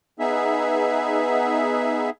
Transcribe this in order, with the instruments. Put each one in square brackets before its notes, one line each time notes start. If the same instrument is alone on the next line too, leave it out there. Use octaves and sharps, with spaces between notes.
[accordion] B3 D#4 G#4 E5